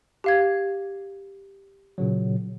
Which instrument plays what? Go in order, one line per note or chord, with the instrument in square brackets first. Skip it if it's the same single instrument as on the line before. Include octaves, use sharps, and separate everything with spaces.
[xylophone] G4 F5 G#6
[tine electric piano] A#2 C#3 F#3